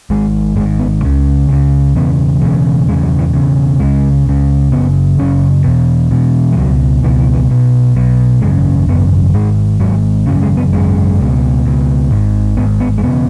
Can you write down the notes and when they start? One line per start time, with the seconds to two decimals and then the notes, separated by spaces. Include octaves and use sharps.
0.10 G#1 G#2 G#3
0.56 G#1 G#3
0.60 G#2
0.79 B3
1.02 C#2 C#3
1.49 C#2 C#3
1.95 E1 E2 C#3 B3
2.41 E1 E2 C#3 G#3
2.88 E1 E2 C#3 G#3
3.03 F#3
3.19 E3
3.33 E1 E2 C#3
3.80 C#2 C#3 G#3
4.26 C#2 C#3
4.72 F#1 F#2 C#3 B3
5.19 F#1 F#2 C#3 C#4
5.64 E1 E2 B2
6.11 E1 E2 B2
6.52 G#3
6.57 C#2 B2 F#3
7.03 C#2 B2 E3
7.19 E3
7.34 E3
7.50 B1 B2
7.95 B1 B2
8.41 G#1 F#2 C#3 G#3
8.88 G#1 F#2 C#3 B3
9.34 G#1 G#2 G#3
9.80 G#1 G#2 F#3
10.26 G#1 F#2 C#3 F#3
10.43 G#3
10.57 B3
10.72 G#1 F#2 C#3 G#3
11.20 C#2 B2
11.65 C#2 B2
12.11 G#1 G#2
12.57 G#1 G#2 B3
12.80 B3
12.98 G#3
13.03 E1 C#3 B3